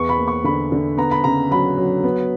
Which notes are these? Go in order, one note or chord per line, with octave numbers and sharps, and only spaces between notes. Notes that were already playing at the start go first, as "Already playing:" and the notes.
Already playing: E2 B3 C#6
B5
A#3
C#6
D3 B5
D3
B3 A#5
B5
C#3 A#5
F#3 B5
F#3
B3